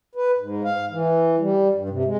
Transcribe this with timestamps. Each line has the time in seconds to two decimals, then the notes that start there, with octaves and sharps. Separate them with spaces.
0.15 B4
0.39 G#2
0.64 F5
0.91 E3
1.39 G3
1.74 G2
1.89 C3
2.05 G#3